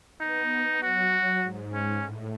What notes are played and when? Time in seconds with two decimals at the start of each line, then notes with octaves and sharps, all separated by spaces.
0.20 B3 D#4
0.81 F#3 F#4
1.43 G#2
1.73 C#4
2.04 A2